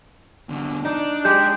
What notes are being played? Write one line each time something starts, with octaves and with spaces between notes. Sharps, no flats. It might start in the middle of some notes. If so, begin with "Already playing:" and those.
E2 D3
D4 D#4
G#3 G4 G6